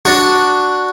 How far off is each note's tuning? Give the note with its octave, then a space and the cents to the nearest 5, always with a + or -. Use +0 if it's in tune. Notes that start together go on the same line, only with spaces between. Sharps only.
D4 +0 F#4 +0